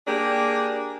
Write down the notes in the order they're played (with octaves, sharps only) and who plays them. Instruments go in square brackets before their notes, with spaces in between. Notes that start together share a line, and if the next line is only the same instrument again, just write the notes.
[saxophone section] A#3 D4 G4 G#4